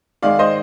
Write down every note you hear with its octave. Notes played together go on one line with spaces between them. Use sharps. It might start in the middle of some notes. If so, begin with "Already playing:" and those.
G#2 D#3 G#3 D5 F5
C5 D#5